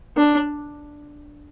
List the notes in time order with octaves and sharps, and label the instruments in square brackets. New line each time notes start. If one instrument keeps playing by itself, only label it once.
[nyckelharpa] D4